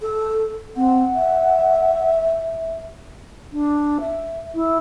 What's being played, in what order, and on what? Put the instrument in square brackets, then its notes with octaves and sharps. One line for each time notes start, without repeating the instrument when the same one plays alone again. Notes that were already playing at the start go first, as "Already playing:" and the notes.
[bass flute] A4
[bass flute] C4 [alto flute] F#5
[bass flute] E5
[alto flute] D4
E5
E4